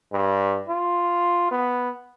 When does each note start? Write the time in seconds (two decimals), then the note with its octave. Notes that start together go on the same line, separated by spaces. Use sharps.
0.13 G2
0.68 F4
1.51 B3